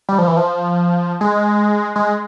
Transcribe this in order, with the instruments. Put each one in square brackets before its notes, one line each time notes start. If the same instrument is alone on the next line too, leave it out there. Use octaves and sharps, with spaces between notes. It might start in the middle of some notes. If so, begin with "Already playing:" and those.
[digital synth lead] G3
F3
E3
F3
G#3
G#3